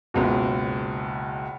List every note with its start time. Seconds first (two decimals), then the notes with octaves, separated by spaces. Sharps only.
0.14 F#1 C#2 B2